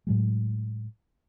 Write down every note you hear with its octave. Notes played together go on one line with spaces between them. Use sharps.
A2 F#3 G#3